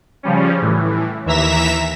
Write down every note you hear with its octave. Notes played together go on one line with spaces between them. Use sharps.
C#3 F3 G3 C#4
A2 E3
D#2 E3 E5 A#5 B6 E7